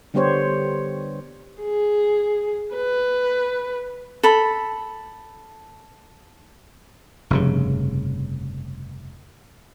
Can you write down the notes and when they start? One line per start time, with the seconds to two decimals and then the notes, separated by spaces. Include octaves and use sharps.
0.14 D3 G3 B3 G4 C5 C#5
1.62 G#4
2.75 B4
4.23 A4 B5
7.30 F1 G2 C#3